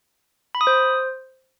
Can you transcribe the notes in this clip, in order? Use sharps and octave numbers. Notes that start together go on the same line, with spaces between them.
B5
D#6
C5